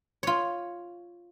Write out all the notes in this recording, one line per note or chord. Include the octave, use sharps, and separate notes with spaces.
F4 C#5